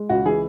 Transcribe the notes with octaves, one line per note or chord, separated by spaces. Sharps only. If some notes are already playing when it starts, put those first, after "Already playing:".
Already playing: G#3
C#2 F#4
E3 G#4